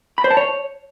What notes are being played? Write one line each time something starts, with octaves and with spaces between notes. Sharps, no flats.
B5
C5
A5
C#5